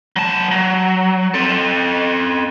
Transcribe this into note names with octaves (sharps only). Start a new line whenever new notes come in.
F#3 A5
F#3
C4 A4